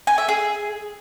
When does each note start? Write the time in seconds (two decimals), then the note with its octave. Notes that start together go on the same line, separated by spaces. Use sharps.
0.07 G#5
0.18 E5
0.29 G#4